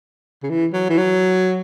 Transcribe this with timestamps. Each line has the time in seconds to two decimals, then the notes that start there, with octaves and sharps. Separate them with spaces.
0.43 C#3
0.49 E3
0.73 F#3
0.89 E3
0.98 F#3